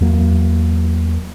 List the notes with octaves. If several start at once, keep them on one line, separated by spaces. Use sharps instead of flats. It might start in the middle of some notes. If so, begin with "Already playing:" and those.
E2 F#3 A#3